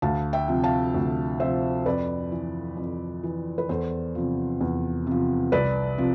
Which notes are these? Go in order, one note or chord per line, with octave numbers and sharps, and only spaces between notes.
D2 F5 A5
E5 G5
C3 F3
F5 A5
D2
C3 F3 C5 E5
F2 B4 D5
E3
F2
E3
B4
E2 A4 C5
C3 F3
E2
C3 F3
C2 B4 D5
C3 F3